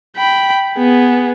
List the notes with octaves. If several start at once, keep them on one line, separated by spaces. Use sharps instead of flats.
G5 B5
B3 G#4